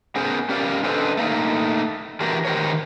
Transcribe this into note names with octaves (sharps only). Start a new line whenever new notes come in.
B3 C#4 G#4 A#4 C5
C#4 G4 A#4 D5 F5
D4 A4 B4 C5 D#5
A3 A#3 D#4
E3 D4 F#4 G4 A#4
D#3 G4 A#4 C5 C#5